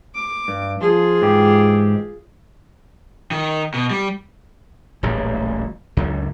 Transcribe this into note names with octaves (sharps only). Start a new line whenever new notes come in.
D6
G2
F3 F4 G#4
G#2 E3 G4
D#3
B2
G3
D1 A1 A#2 G3
C#2 F#2 D3